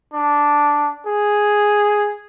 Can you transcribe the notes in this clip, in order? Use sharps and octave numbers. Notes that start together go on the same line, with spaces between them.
D4
G#4